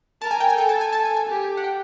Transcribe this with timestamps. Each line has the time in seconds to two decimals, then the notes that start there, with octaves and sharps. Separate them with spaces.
0.22 A#4 A5
0.31 G#5
0.40 G5
0.49 G#5
0.57 A4 G5
0.69 A5
0.81 G#5
0.93 A5
1.05 G#5
1.17 G#5
1.29 G4
1.57 F#5
1.64 G5